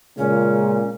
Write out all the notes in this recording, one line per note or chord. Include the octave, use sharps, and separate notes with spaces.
A#2 C#3 G#3 C#4